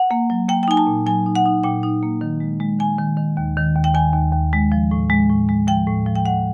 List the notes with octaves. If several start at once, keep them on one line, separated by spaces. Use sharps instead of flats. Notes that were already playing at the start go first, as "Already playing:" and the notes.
Already playing: F#5
A#3
F#3
A#3 G5
G5
D#4 G#5
A5
A#2
F#3 G#5
D#4
F#5
D#4
A#2 G5
D#4
A#3
D#3
G#3
G#3
D#3 G#5
D#3
D#3
D#2
D#3
D#2
G5
D#3 G#5
D#2
D#2
G#3
F3
A2
G#3
A2
G#3
F3 G5
A2
F3
G5
A2 F#5